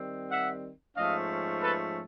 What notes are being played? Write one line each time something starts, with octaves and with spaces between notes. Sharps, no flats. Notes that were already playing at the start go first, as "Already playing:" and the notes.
Already playing: D#3 G3 C4
E5 F#5
G#2 F3 A3 C#4 D#5 F5
A4 B4